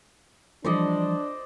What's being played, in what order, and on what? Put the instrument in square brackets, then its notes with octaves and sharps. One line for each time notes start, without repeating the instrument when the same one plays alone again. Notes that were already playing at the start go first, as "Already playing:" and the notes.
[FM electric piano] E3 F3 G3 [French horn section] D4 [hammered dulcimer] C5 D5 D#5